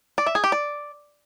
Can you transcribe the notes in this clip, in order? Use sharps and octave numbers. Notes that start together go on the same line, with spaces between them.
D5
E5
G#4
G4
D5